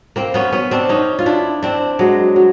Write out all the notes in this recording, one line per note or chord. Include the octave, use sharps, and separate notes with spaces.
A#3 C4
B3 C#4
B3 C#4
C4 D4
C#4 D#4
F4
D4 E4
C4 D4
F#3 G#3
F#3